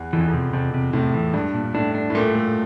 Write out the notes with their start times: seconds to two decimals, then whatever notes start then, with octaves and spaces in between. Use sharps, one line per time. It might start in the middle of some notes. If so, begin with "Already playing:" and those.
Already playing: E2
0.13 F2 E3
0.20 E2
0.27 F2
0.33 C3
0.53 F2 C3
0.74 C3
0.93 A2 C3
1.14 E3
1.34 G2 D4
1.54 A#2
1.74 A2 D4
1.95 D4
2.10 A2
2.15 A#2 A3
2.35 A3